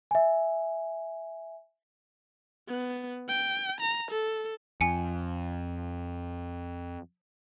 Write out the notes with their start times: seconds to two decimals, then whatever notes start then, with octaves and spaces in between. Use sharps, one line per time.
0.11 E5 G#5
2.68 B3
3.28 G5
3.81 A#5
4.11 A4
4.81 F2 G#5 C#7